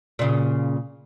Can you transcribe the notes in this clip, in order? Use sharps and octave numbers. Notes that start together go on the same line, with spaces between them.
A#2 C#3